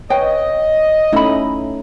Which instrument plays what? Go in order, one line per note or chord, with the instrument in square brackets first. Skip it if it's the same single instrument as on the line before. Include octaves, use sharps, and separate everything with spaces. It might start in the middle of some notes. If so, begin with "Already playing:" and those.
[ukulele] B4 G5 [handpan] C#5 [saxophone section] D#5
[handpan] A3 C#4 D#4 [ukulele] E4 B5